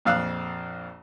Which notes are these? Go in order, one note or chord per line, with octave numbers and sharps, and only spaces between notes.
A#1 F2 F5 E6 F#6